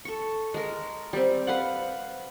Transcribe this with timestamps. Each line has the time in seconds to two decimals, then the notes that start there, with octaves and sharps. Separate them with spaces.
0.05 A4 C#6
0.54 G#3 A#4
1.13 G3 C4
1.47 B4 F5 F#5